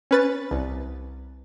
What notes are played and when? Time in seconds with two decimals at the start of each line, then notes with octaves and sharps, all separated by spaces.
0.11 C#4 B4 A6
0.51 C2